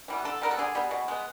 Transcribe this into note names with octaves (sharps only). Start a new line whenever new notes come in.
E3 G3 B3
D3 A4
G3 B3 A#4
A4
D3 G#4
G3 B3
B2
G#3 B3